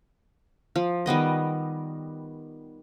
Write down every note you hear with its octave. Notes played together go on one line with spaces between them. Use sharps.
F3
D#3 G3 B3 D#5